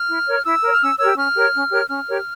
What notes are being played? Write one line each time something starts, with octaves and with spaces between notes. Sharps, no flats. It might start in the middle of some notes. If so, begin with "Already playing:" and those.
Already playing: F6
E4
A#4 C#5
E4 E6
A#4 C#5
F6
C#4 E6
G4 A#4 C#5 E6
C#4 F6
G4 A#4 C#5
C#4
G4 A#4 C#5
C#4 F6
G4 A#4 C#5